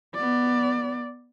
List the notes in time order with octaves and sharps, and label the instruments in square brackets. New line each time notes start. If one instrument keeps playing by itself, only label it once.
[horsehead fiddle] B3 D5